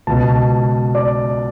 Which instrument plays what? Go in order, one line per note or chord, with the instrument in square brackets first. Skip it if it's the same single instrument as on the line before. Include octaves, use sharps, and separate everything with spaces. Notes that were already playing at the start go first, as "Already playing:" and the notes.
[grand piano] C#2 B2 A5
D5